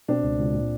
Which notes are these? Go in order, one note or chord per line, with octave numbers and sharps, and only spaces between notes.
B2 C4 D4
C#2
C#2
A#2